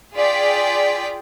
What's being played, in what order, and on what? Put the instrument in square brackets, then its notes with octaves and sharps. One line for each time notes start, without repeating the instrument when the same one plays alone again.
[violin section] F4 G#4 D5 G5 B6